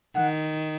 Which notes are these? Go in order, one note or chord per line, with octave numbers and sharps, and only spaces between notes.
D#3 F#5